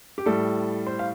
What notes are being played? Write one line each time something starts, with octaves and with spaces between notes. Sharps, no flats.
G4
A2 G3 A4
C5
F5